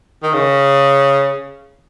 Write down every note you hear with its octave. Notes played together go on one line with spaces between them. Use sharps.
D#3
C#3